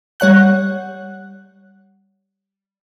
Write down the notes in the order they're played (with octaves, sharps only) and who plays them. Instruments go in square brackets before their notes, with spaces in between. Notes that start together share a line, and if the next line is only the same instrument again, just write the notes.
[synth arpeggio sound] G3 C#5 F#5 F#6